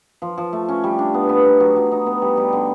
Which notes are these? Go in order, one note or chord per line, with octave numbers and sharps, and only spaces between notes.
F3
F3
A3
C#4
G3
D4
B3
B3
D#4
F#3
F#3
D#4
B3
G3
G3
D3